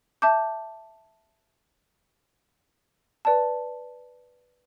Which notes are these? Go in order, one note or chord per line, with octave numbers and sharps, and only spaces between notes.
E5 A5 D6 G6
B4 D5 A5